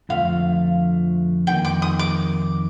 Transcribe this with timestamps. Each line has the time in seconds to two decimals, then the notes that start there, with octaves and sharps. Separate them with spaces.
0.09 F2 D3 F3 A3 F5
1.47 F2 D#3 A#3 D#4 G5
1.65 D6
1.82 D#6
1.99 D6